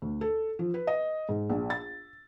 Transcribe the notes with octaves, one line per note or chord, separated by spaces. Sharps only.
D2
A4
F3
B4
D#5
G#2
A#1
A6